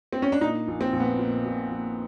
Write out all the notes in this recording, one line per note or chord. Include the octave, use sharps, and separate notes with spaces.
C4
C#4
D4
A#2 D#4
A#1
C4
A#1
B3
A#2
A#2
A#1